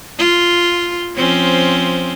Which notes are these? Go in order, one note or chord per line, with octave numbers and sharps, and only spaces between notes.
F4
F3 C4 C#4